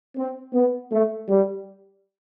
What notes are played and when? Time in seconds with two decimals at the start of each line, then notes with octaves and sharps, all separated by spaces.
0.16 C4
0.54 B3
0.92 A3
1.29 G3